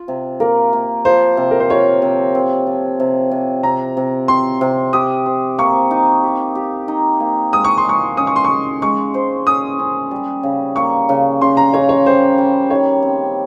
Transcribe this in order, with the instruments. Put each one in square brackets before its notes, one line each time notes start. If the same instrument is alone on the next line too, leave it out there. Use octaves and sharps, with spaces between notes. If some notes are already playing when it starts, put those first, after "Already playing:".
Already playing: [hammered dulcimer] F4
C3
[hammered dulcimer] A#3 [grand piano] A#4
[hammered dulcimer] A#3
[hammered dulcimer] F3 [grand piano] C5
[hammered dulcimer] C3
[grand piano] A#4
C5
[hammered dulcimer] F4 [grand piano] C#5
[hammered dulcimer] C3
C4
F3
C3
C3
[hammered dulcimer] C3 [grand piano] A#5
[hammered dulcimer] C3
[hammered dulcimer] C4 [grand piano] C6
[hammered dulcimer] C3
[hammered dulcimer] G4 [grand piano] D#6
[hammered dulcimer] C5
[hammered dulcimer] A#3 [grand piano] C#6
[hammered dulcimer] D#4
G4
G4
D#4
A#3
[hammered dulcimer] G#3 [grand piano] D#6
[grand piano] C#6
C6
[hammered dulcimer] G#3 [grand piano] C#6
[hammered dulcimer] C#4 [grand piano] D#6
[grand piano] C#6
C6
[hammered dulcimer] G#3 [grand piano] C#6
[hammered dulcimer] G#3 [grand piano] C#6
[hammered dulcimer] C5
[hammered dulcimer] C#4 [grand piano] D#6
[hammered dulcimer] C#4
G3
C#3
[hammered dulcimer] A#3 [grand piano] C#6
[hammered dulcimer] C#3
[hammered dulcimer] C#3 [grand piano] C6
[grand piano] A#5
[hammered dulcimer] C#3 [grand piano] C#5
[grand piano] C#5
[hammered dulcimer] G3 [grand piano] C5
[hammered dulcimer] G3
[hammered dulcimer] D#3 [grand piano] C#5
[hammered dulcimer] C4